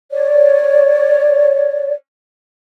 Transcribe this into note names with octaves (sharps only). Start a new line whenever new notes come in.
C#5 D5